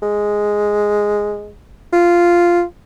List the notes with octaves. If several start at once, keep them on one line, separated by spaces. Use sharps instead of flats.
G#3
F4